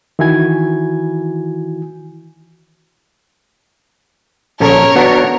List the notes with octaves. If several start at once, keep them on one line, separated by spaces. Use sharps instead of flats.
D#3 E3 E4 F#4 G#5 G#6
A#1 C#4 A4 A#4 C#5
B3 D4 F#4